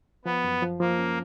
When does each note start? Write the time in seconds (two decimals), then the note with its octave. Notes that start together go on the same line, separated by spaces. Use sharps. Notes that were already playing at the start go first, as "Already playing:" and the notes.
0.25 F3 B3
0.44 F#2
0.62 F3
0.80 F3 A#3
0.99 C#4